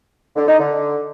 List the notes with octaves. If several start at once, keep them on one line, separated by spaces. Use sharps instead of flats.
D3
D#4
D3